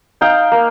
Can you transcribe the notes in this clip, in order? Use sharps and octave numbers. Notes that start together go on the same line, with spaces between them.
D#4 F5 G5
A#3